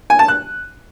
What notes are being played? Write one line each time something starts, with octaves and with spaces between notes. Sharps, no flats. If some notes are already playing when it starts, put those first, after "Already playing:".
G#5
A5
F#6